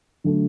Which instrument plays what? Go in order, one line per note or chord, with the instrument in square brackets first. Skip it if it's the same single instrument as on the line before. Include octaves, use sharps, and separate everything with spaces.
[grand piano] D3 F#3 A3